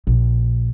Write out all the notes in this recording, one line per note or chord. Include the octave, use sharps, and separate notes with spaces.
A#1